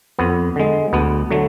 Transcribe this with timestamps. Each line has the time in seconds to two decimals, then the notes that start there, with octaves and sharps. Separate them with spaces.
0.19 F2 B3
0.56 D3 G#3
0.93 D2 B3
1.30 D3 F#3 A3